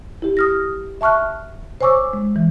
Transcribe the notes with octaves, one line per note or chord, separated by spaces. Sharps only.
E4 G4
D#6 F6 A#6
E5 A5 C#6 F6 F#6
C5 C#5 G#5 C#6 D6 E6
G#3
E3